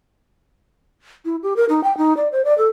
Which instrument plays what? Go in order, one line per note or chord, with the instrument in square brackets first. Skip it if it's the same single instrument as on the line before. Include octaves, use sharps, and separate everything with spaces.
[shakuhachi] E4
G4
A#4
D#4
G5
D#4
D5
C5
D5
A4